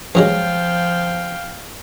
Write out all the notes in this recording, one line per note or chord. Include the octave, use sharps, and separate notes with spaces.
G2 F3 F#3 G#3 F5 G5